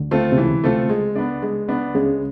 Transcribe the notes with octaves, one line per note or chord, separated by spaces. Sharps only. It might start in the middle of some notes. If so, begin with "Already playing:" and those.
Already playing: D2 D3
A3 C4 F4 A4
C3
C#2 C#3 E3
A3 C4 F4 A4
G#3
B3 D4
G#3
B3 D4
C#2 C#3 G#3